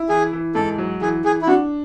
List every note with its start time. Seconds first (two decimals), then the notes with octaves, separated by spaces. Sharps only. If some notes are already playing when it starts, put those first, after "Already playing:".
Already playing: E4
0.09 E3 G#4
0.33 E3
0.55 G#2 A4
0.78 F#3
1.01 E3 G#4
1.24 E3 G#4
1.42 E4
1.47 D4 F#4